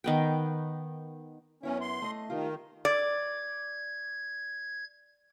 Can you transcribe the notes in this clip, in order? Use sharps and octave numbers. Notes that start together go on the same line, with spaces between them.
D#3 B3 G5
F#2 B3 C#4 E4
C6
A3 D#5
D#3 F4 G4 A#4
D5 G#6